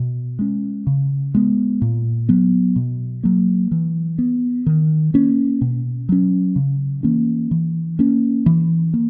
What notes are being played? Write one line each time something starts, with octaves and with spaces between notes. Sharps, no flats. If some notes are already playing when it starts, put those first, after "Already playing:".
Already playing: B2
G#3 C#4
C#3
G#3 B3
A#2
F#3 B3
B2
F#3 A#3
E3
B3
D#3
A#3 C#4
B2
F#3 C#4
C#3
E3 A#3 C#4
E3
A#3 C#4
E3
A#3